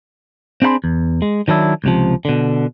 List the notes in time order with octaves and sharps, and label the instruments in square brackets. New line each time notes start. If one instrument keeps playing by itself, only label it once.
[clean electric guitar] C4 D4 G#4 F#5 B5 C6
E2
G#3
D#3 F#3 D4 E4
C#2 C3 F3
B2 D3